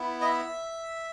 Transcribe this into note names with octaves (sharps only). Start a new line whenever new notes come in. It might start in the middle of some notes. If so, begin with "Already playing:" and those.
Already playing: B3 E4
D#5
E5